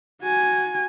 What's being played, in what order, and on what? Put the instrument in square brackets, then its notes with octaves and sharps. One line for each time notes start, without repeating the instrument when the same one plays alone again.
[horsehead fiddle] F#4 G#5